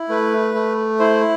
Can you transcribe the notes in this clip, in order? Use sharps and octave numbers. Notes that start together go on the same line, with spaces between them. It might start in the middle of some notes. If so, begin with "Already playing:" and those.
Already playing: E4
A3 B4
A3
E4 C5